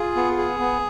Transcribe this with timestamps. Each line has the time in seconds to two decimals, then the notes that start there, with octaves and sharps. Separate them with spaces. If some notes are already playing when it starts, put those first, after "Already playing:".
Already playing: F4 G#4
0.16 B3
0.38 G#4
0.60 B3